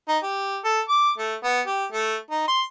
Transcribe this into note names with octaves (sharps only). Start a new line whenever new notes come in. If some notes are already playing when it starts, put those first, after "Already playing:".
D#4
G4
A4
D6
A3
B3
G4
A3
D#4
C6